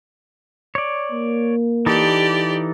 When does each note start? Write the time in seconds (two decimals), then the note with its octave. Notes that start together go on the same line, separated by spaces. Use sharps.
0.75 C#5 D5
1.12 A#3
1.86 E3 D#4 G4 A4 D5